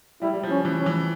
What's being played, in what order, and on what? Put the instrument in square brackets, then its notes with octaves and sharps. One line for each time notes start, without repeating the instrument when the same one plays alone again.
[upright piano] G3 [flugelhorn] E4
[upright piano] G3
F3
[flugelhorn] C#4
[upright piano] E3
[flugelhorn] C#4
[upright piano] E3